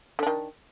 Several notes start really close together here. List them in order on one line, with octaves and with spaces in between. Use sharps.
D3 D4 D#3